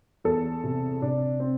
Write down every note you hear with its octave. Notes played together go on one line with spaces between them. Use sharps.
E2 A4
C3
C3 D4
C4